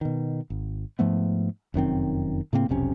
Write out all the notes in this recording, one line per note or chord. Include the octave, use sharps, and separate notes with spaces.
B2 D#3
G#1
G#2 F3 A3 B3
F1 F#2 D#3 C4
A2 C#3 A#3 C4
F1 B1 C3 C#4